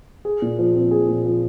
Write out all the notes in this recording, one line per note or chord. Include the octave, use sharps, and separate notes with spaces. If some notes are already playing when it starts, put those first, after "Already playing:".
G#4
A#2
F3
C4
G#4
A#2
F3